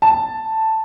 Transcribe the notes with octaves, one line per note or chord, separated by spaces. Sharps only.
A5